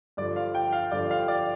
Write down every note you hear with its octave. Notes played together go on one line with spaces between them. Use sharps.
G2 D3 F3 D5
F5
G5
F5
G2 D3 F3 D5
F5
D5